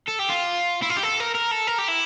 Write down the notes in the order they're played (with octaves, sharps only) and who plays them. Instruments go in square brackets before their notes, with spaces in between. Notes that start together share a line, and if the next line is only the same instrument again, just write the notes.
[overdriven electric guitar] A4
G4
F4
E4
F4
G4
A4
A#4
A#4
A4
A#4
G4
E4